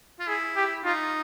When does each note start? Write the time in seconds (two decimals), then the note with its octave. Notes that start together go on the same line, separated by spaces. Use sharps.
0.20 F4
0.28 E4 G#4
0.56 G4
0.85 D#4 F4